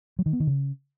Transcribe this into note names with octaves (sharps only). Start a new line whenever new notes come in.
F#3
D#3
B3
D#3
C#3